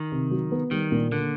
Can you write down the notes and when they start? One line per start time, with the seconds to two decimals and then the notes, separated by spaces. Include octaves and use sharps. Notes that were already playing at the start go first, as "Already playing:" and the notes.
Already playing: D#3
0.12 C3
0.31 F#3
0.52 B3
0.71 D#3 G3
0.92 A#2
1.11 D3 A#3